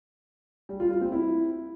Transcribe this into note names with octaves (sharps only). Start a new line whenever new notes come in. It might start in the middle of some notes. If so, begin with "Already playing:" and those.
G3
F4
F4
C4
E4